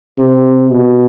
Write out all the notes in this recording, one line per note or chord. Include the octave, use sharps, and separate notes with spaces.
C3
B2